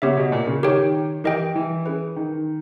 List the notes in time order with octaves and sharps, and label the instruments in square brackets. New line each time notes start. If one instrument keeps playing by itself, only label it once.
[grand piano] C#3 [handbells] B3 G4 C#5 E5
[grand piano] B2
A#2
C#3
[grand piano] D#3 [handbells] G4 A#4 C#5 G5
[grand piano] E3 [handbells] G4 A#4 D#5 G5
[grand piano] E3
[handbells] C#4 G#4 B4
[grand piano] D#3